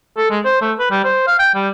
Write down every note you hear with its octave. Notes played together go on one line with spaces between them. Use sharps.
A4
G#3
C5
A3
B4
G3
C5
F5
G5
G3